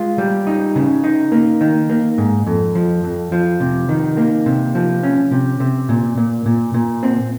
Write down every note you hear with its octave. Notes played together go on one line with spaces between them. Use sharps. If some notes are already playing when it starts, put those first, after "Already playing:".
Already playing: G#3 F4
G3
D#4
C#3
D#4
A#3
D#3
A#3
G#2
F2
F3
F2
F3
C3
D#3
A#3
C3
F3
C#4
C3
C3
A#2
A#2
A#2
A#2
C4